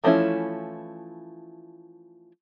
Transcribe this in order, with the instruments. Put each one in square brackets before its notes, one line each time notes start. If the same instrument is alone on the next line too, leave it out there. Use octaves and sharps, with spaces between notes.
[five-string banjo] E3 F3 A3 C#4 E4